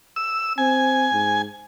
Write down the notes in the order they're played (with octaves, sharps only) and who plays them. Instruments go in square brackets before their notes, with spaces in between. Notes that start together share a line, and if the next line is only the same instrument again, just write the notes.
[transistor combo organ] E6
[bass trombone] C4 [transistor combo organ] G#5
[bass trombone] G#2